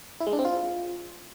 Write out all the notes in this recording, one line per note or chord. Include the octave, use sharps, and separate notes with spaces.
E4
G#3
D4
C4
F4